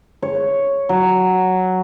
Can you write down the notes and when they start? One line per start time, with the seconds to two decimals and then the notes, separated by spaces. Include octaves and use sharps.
0.22 C#5
0.89 F#3